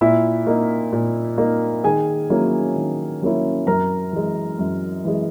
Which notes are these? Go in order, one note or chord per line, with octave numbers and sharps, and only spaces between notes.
A#2 E4 E5
A#3 D#4
A#2
A#3 D#4
D#3 G#4 G#5
F#3 A#3 C#4 E4
D#3
F#3 A#3 C#4 E4
F#2 A#4 A#5
E3 G#3
F#2
E3 G#3